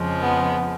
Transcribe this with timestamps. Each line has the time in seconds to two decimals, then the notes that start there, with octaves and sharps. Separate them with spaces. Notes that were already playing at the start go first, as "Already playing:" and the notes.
Already playing: F2 C#3 F3 G#3
0.20 B3